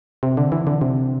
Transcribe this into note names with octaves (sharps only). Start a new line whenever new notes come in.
C3
D3
E3
D3
C3